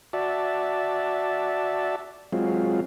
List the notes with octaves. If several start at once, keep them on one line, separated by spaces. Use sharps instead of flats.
F#4 D5 E5 A5
F#3 G#3 C4 F4